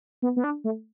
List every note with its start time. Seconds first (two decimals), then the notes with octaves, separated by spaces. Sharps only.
0.22 B3
0.36 B3
0.44 D4
0.64 A3